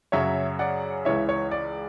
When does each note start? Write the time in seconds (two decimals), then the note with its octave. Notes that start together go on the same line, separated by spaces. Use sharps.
0.12 F#2 C#3 F#3 C#5 E5
0.59 D5 F#5
1.05 C#2 C#3 E3 C#5 E5
1.29 C#5
1.51 D5